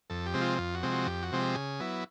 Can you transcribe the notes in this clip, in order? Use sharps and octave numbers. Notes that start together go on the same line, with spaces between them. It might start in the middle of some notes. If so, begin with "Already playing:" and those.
F2 A4
G4
C3 F3 G#3 C4
F4
F2 F4
F#4
C3 F3 G#3 C4
F#4
F2 G4
F#4
C3 F3 G#3 C4
G4
C#3 G#4
F#3 B3 E4